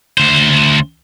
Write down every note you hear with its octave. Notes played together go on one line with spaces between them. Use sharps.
D2 C5